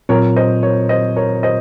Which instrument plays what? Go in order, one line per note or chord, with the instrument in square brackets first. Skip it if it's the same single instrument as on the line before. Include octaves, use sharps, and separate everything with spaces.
[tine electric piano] A#2 F#3 C4 F4 [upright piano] A#4 C#5
[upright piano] C5 D#5
A#4 C#5
C5 D#5
A#4 C#5
C5 D#5